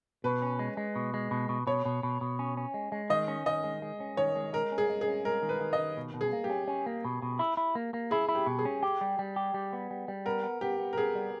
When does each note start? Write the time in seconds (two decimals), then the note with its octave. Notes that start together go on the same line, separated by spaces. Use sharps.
0.24 B2 B4
0.42 C#4
0.59 G#3
0.77 G#3
0.96 B2
1.14 G#3
1.31 B2
1.49 B2
1.67 B2 C#5
1.85 B2
2.03 B2
2.21 B2
2.39 C#4
2.57 C#4
2.74 G#3
2.92 G#3
3.10 D#3 D#5
3.28 C#4
3.46 D#3 D#5
3.64 G#3
3.82 G#3
4.00 C#4
4.17 D#3 C#5
4.36 G#3
4.53 G#3 A#4
4.72 C#4
4.78 G#4
4.90 G#3
5.01 G#4
5.08 C#4
5.25 G#3 A#4
5.42 D#3
5.49 B4
5.60 D#3
5.73 D#5
5.79 D#3
5.97 B2
6.14 B2
6.21 G#4
6.33 A#3
6.44 G4
6.50 C#4
6.68 C#4
6.86 A#3
7.05 B2
7.22 B2
7.39 E4
7.57 E4
7.75 A#3
7.94 A#3
8.11 E4 G#4
8.29 E4
8.35 G4
8.46 B2
8.59 G#4
8.65 C#4
8.83 G4
9.01 G3
9.19 G3
9.36 G4
9.54 G3
9.73 B3
9.91 G3
10.08 G3
10.25 B3 A#4
10.43 B3
10.61 B3 G4
10.79 B3
10.93 A#4
10.97 B3 G#4
11.15 G3